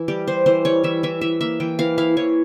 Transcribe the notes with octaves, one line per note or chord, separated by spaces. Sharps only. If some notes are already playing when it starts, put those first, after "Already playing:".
Already playing: E3 E4
G3 G4
G3 C5
E3 C5
G3 C#5
E3 E5
E3 E5
E3 E5
A#3 E5
E3 G5
E3 F5
E4 F5
E3 C#5